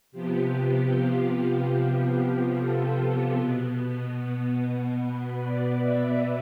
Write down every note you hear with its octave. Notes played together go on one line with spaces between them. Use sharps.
C3 F3 B3 G4
G4
F4
G4
F4
G4
A4
B2 B3
B4
D5
E5